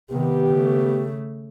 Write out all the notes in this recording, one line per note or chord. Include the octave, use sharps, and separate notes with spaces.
C3 D#3 B3 G4
C#3 A3